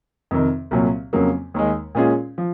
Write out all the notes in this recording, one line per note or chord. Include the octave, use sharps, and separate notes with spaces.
F2 C3 D#3
C2 A#2 F#3 A#3
F2 C#3 F#3 A#3
D#2 D#3 G#3
A#2 G#3 C#4 F4 G#4
F3